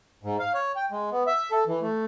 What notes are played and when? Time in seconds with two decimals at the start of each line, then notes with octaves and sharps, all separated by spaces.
0.23 G#2
0.40 F5
0.54 C#5
0.76 G5
0.91 G#3
1.12 B3
1.27 E5
1.51 A4
1.67 E3
1.81 A3